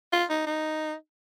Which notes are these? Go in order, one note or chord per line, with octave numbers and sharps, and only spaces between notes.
F4
D#4
D#4